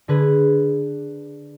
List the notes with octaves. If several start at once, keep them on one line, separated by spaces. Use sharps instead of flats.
D3 G#4 B4